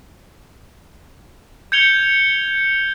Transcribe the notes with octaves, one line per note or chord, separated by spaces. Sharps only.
G6 G#6 C#7 F7 G7